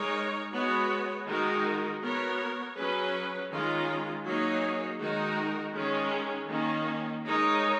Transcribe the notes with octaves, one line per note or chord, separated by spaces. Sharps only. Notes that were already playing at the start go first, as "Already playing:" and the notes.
Already playing: G#3 D#4 A#4 C#5
G#3 B3 F#4 C#5
D#3 G#3 D#4 F#4 A#4
B3 F#4 A#4 C#5
F#3 C#4 G#4 B4
D#3 G#3 C#4 F4
F#3 A#3 D#4 G#4 C#5
D#3 G#3 D#4 F#4 A#4
D#3 G#3 C#4 G#4
D#3 A#3 C#4
G#3 D#4 A#4 C#5